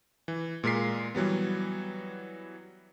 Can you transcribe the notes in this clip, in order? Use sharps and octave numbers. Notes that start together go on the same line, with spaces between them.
E3
A#2 G#3 A#4 B6 C7
E3 F#3 G3 B3